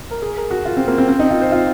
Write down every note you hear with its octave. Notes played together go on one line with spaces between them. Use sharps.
A#4
G#4
A#4
F#4
F4
C4
A#3
C4
C4
D#4
F4
C5
F4